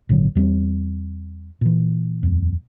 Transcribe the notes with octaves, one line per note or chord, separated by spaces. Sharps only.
G#1 A#2 D3 F#3
E2 G3 G#3 C4
A#2 E3
D#1 F2